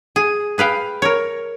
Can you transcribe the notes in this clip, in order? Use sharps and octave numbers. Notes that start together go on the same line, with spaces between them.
G#4
G#4 B4 F5 G5
A#4 C#5